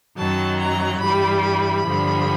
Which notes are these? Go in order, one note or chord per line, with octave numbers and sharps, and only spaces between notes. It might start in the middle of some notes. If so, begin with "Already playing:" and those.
F#2 D#3 F#3 A5
A#5
G2 E3 G3 B5
B5
G2 D3 F3